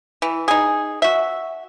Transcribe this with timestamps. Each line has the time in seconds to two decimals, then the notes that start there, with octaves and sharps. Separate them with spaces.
0.22 E3
0.48 D#4 G#4
1.02 F#4 E5